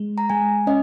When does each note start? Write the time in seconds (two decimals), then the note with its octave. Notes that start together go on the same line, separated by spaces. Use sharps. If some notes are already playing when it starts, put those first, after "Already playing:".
Already playing: G#3
0.18 A#5
0.30 G#3 G#5
0.67 C#4 D#5